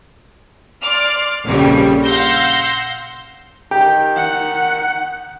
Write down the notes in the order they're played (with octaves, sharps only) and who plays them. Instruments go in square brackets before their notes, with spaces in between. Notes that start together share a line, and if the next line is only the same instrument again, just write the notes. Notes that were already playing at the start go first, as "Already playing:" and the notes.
[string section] D5 C6 D6 F6
A#1 F2 A#2 C#3 G3
F5 F#5 C6 E6 G6 A#6
[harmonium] D#3 D#4 [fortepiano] G4
[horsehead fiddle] F#5